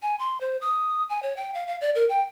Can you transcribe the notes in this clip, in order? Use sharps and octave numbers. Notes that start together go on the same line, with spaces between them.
G#5
C6
C5
D#6
G#5
C#5
G5
F5
F5
D5
A#4
G5